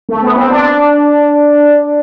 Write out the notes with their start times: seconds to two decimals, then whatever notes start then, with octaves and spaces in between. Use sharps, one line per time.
0.09 A3
0.22 B3
0.36 C4
0.50 D4